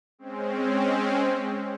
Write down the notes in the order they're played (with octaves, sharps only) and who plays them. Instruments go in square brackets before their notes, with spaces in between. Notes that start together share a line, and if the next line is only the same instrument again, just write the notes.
[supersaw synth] G#3 C4 C#4